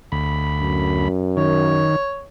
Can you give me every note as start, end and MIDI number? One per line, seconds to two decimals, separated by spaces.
0.12 1.08 38
0.12 1.08 83
0.61 1.94 42
1.37 1.96 51
1.37 2.25 73